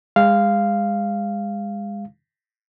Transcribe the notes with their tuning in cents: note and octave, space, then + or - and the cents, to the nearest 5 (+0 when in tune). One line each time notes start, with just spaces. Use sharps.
G#3 -25 F5 -5